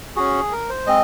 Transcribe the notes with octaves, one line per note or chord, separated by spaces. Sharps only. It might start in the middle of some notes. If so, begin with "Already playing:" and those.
C#4 F#4 G#4
A#4
C5
G#3 C4 D#5